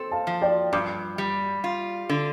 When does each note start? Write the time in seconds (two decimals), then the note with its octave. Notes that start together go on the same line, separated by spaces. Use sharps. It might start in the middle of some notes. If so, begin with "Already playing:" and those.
Already playing: C4 A4 C6
0.11 F5 A5
0.27 F3
0.42 D5 G5
0.73 G2 D6 G6
1.18 G3
1.64 F4
2.09 D3